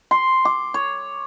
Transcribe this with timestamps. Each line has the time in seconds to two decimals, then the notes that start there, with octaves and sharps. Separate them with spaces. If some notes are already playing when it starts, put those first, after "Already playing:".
0.11 C6
0.45 D6
0.74 C#5